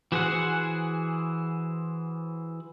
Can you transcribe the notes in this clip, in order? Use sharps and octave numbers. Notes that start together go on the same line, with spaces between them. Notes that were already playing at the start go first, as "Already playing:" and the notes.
E3 F#4 G#4 C5 F#5